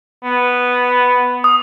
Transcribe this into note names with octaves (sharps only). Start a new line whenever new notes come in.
B3
D#6